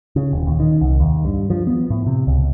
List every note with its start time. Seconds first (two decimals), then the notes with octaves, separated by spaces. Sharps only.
0.16 C#3
0.33 D#1
0.47 D#2
0.60 D#3
0.81 C2
1.00 D#2
1.25 G2
1.50 F3
1.67 B3
1.90 A2
2.07 C3
2.27 C#2